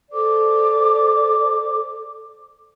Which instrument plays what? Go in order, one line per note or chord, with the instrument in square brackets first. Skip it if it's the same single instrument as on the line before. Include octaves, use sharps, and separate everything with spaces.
[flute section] A4 C5 D5 D6